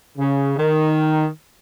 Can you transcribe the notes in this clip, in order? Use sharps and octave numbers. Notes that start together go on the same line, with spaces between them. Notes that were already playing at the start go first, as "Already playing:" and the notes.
C#3
D#3